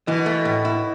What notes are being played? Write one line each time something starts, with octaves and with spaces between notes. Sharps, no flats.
B2 E3
A3
A2
E4